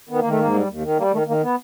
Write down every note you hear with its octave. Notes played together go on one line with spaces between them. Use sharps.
D#3 B3
D#3 A#3
A3
G#2 A#3
G3
D#2
D#3
G3 A#3
D#3 A3
D#3 A#3
B3